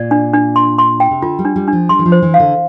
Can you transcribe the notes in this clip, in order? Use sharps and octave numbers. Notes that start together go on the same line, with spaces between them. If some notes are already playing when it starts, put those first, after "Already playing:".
Already playing: A#2 D5
D4
D4
C6
C6
G5
C3
D3 F4
G3
D4
G3
D4
F3
G3 C6
E3
F3
C5
E3
F5
D3